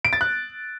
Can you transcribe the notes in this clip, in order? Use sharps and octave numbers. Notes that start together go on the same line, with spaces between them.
D7
A6
F#6